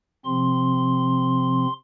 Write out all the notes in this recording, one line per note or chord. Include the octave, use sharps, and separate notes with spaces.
C3 F3 C4 C6